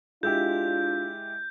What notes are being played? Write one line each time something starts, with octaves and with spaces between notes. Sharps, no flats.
G#3 D4 E4 F4 G4 G6